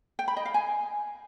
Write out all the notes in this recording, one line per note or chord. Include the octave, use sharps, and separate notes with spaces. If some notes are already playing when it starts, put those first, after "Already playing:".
G5
B5
D#5
F5
G#5